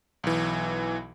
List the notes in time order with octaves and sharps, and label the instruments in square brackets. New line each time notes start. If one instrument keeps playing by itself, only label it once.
[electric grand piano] B1 E3